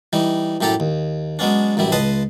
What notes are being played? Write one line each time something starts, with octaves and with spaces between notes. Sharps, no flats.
E3 G3 D#4
F#2 A2 G4 A4 A#5
D#2
F#3 G#3 B3 C#4 D4
A1 F#2 G3 E4
C#2 B4 D#5 A5 C6 D#6